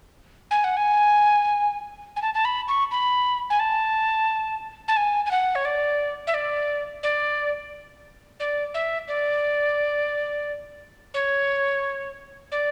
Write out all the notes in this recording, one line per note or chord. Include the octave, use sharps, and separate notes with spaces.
G#5
F#5
G#5
G#5
A5
A5
B5
C#6
B5
G#5
A5
A5
G#5
G#5
F#5
C#5
D5
E5
D5
D5
D5
E5
D5
C#5
D5